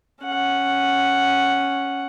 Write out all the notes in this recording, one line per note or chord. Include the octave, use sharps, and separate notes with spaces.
C#4 F#5